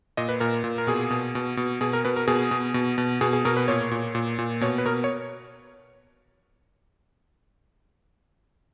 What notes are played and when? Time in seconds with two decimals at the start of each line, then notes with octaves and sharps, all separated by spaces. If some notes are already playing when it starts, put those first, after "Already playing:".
0.17 A#2 D#5
0.29 B4
0.40 A#2 A#4
0.64 A#2
0.78 A#4
0.87 B2 G#4
1.10 B2
1.35 B2
1.57 B2
1.81 B2 G#4
1.93 A#4
2.05 B2 B4
2.16 A#4
2.27 B2 G#4
2.51 B2
2.74 B2
2.98 B2
3.21 B2 G#4
3.33 G#4
3.45 B2 A#4
3.57 B4
3.68 A#2 C#5
3.91 A#2
4.15 A#2
4.39 A#2
4.61 B2 C#5
4.78 B4
4.85 B2 A#4
5.04 C#5